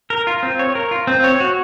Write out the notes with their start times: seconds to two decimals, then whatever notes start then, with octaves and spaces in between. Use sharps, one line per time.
0.10 A#4
0.27 F4
0.43 C4
0.59 C#5
0.75 A#4
0.91 F4
1.07 C4
1.24 C#5
1.40 F#4